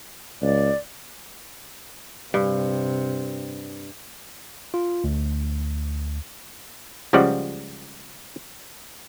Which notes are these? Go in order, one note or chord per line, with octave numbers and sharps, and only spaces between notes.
C#2 D5
G2 C3
F4
D2
C#2 C#3 F3 G3 D5 F#5